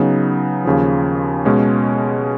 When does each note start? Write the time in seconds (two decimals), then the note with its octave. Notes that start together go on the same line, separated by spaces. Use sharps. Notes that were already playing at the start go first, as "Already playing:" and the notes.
Already playing: C#3 F#3 B3 D#4
0.65 D#2 C#3 F3
1.45 B2 G#3 C#4